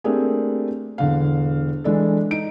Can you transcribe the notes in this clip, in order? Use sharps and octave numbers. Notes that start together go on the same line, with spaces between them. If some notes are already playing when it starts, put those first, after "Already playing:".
A3 A#3 C4 D4 G4 G#4
E1 D3 F5
E3 G#3 D4 A4
D#4 D7